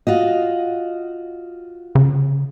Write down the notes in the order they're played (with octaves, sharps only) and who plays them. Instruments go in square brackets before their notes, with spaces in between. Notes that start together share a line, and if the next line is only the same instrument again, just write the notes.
[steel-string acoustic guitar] F4 F#4 D#5
[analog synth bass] C#3